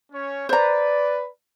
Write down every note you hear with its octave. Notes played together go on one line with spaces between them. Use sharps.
C#4 C#5
B4 C5 D5 A#5